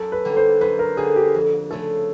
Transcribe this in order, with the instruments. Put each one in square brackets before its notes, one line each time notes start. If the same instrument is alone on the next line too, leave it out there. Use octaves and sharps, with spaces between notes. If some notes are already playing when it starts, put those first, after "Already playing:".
Already playing: [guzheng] F#2 [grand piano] A4
[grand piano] B4
[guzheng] D3 G3 A#3
[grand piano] C5
[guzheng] F#2 [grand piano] B4
[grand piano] A#4
[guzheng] D3 G3 A#3 [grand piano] G#4
[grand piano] G4
[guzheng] F2
[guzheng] C#3 F3 A3 [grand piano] A4